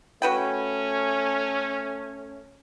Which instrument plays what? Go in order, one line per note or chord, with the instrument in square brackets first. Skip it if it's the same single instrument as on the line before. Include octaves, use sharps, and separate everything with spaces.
[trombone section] A3 C#4 [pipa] F#4 B4 G5